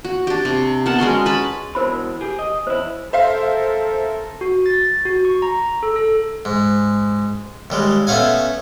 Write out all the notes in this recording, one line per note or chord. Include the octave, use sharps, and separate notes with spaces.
F#4
D4 G4
C3
B3 A#4 F#5 A5
G#3 C#4 F#4 C6
B4 A5 B5
B2 E3 A#4 C5 B5
G4 G#4
D#5
E2 E4 C5
A4 A#4 C5 E5 F5
F#4
A6
F#4
C#6
A#5
A4
A4
G#2
D#2 G3 G#3
A3 B3 C#4 F5 F#5 G#5